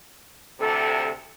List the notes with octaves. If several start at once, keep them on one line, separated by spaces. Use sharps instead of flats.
D2 C3 A4